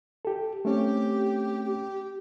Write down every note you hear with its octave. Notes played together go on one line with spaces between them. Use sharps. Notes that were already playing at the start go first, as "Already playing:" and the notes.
G4 A4
A3 C4 C#4 G4
G4